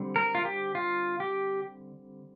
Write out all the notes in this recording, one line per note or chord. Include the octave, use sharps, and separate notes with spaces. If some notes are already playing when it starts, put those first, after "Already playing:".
Already playing: D3 G3 C4
A#4
F4
G4
F4
G4